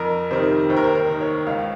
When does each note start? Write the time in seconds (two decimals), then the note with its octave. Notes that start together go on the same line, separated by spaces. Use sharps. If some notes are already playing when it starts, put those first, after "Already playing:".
Already playing: F2 A#4
0.31 C3 D#3 C5
0.69 D#2 C5
0.77 A#4
0.84 C5
0.95 A#4
1.08 D#3
1.21 C#5
1.46 C#2 F5